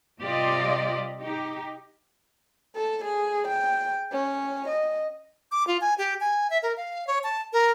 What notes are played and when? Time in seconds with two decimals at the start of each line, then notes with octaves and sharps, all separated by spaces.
0.21 C3 G3 F4 G4 D5 D#5
1.21 D#4 G4
2.76 A4
3.04 G#4
3.47 G5
4.12 C#4
4.68 D#5
5.51 D6
5.67 F4
5.81 G#5
5.98 G4
6.20 G#5
6.50 E5
6.63 A#4
6.77 F5
7.07 C#5
7.24 A5
7.53 A#4